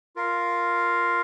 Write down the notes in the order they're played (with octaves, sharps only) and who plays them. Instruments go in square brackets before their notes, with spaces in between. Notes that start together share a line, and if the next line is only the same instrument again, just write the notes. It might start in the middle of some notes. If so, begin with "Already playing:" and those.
[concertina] F4 A#4 F5